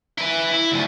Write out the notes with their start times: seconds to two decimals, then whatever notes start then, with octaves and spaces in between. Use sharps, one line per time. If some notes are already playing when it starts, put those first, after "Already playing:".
0.18 E4 B4
0.51 E4
0.72 D2 F3